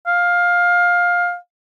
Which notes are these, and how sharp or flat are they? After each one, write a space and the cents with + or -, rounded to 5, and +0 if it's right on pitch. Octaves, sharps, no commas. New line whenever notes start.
F5 +15